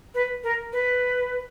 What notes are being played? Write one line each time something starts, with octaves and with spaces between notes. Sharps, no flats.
B4
A#4
B4